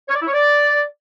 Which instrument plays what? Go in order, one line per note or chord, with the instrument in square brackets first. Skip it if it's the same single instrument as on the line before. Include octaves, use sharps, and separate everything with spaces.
[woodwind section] C#5
D5
E4
C#5
D5